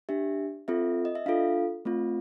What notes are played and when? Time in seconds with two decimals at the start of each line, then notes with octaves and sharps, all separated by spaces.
0.09 D4 G4 E5
0.68 C4 F4 A4 E5
1.05 D#5
1.15 E5
1.26 D4 F4 A4 F5
1.85 A3 C4 F4